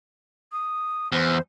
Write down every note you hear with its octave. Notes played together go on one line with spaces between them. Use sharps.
D#6
E2 C5